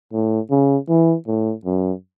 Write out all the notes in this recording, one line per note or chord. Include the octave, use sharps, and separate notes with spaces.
A2
C#3
E3
A2
F#2